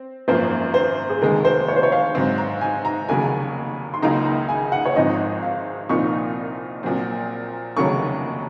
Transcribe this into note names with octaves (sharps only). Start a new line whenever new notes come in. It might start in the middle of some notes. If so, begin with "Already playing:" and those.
Already playing: C4
G#1 F#2 F3 A#3 C5
C5
G#4
F1 D#2 D#3 G#3 A#4
C5
C#5
C5
C#5
F5
G#2 F#3 C4
A#5
G#5
A#5
F1 D#2 C#3 F#3 G#5
C6
C#2 C#3 F#3 A#3 D#4 A#5
A#5
G#5
F#5
C#5
G#1 G#2 F3 C4 D#4 D#5
F5
C2 A#2 F3 C4 D#4 C#6
A#1 A#2 F#3 C4
F1 D#2 C#3 F#3 C#4 C#6